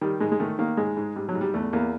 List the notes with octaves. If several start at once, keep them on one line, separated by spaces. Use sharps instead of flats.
D#3 G3
G#2 G#3
G#3
D#3 A3
D#3 A#3
G#2 G#3
G#2
G#2 G3
F#3
G#2
G3
E2 A3
E2 A#3